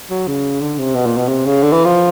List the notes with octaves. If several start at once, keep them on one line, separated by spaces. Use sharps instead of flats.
F#3
C#3
D3
C3
B2
A#2
B2
C3
C#3
D3
E3
F3